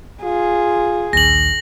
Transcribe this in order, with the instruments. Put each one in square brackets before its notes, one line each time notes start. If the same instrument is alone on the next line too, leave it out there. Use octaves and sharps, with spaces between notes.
[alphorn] F4 [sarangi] G#4
[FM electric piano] A#1 D#2 [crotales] A#6 F#7